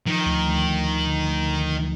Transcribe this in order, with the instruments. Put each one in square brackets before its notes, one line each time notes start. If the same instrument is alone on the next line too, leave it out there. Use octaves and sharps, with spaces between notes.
[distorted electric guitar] D#3 [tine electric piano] F3
[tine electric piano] D2
D2
D2
D2
D3
D2
D3
D2